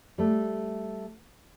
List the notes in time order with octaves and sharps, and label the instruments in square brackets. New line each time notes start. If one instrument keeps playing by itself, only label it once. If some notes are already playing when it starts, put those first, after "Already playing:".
[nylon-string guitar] G3 A3